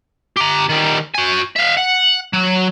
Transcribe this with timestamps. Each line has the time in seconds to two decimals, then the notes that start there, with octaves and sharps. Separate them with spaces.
0.37 G4 A#5
0.69 D#3 G3
1.15 F#4 G#5
1.56 E5 F5
1.77 F#5
2.33 F#3